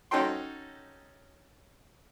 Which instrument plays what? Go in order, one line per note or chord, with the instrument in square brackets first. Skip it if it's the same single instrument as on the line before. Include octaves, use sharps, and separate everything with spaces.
[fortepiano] C#4 D#4 F#4 A4 G5 C6